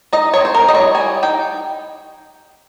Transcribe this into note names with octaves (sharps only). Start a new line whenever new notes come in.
D#4 D#5
C#5
C4 C5
A#4
G3 D#5
C#5
G3 G#5
D#4 G5